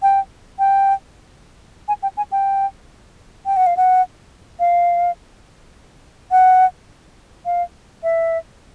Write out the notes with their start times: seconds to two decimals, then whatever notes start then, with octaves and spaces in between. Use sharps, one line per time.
0.02 G5
0.59 G5
1.88 G#5
2.03 G5
2.17 G#5
2.32 G5
3.46 G5
3.56 F#5
3.66 F5
3.77 F#5
4.60 F5
6.31 F#5
7.45 F5
8.03 E5